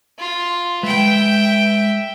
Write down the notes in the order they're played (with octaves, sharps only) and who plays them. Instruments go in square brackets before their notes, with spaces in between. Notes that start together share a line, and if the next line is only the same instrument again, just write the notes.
[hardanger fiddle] F4
[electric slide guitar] G#3 B4 [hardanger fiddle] E5 G5